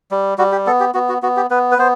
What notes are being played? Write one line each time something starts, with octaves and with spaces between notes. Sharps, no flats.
G3
G3 F#4
G4
B3 A4
G4
B3 F#4
F#4
B3 F#4
G4
B3 B4
B4
B3 C5